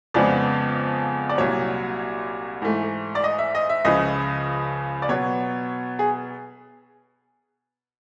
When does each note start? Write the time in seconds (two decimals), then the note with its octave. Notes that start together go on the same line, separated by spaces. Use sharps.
0.14 F2 C#3 F3 G#3 B3 D5
1.29 D5
1.38 C2 A#2 F#3 C#5
2.62 G#2 E3 A3
3.15 D5
3.24 D#5
3.38 E5
3.55 D#5
3.70 E5
3.85 C#2 C#3 F3 D#5
5.02 D5
5.09 B2 F#3 B3 C#5
5.99 G#4